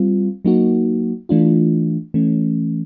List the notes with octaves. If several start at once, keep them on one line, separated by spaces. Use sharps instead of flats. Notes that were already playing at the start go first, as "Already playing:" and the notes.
Already playing: G3 C4 F4
F#3 A#3 D#4 F#4
E3 A3 D4 F4
E3 A3 C#4